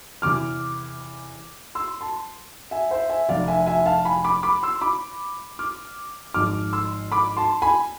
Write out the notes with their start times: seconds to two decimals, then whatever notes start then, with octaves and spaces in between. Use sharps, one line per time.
0.22 E2 C3 E3 D6 F6
1.75 C6 E6
2.01 A5 C6
2.71 E5 G#5
2.90 C5 E5
3.09 E5 G#5
3.28 F1 F2 C3 D5 F5
3.48 E5 G#5
3.67 E5 G#5
3.86 F5 A5
4.05 G#5 B5
4.24 B5 D6
4.43 B5 D6
4.63 C6 E6
4.81 B5 D6
5.59 D6 F6
6.34 G#1 G#2 F3 D6 F6
6.73 C6 E6
7.12 B5 D6
7.37 A5 C6
7.62 G#5 B5